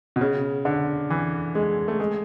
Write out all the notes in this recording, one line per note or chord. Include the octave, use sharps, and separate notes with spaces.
B2
C#3
D3
E3
G#3
A3
G#3